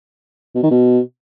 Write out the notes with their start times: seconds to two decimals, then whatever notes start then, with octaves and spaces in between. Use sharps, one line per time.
0.55 B2
0.63 D#3
0.71 B2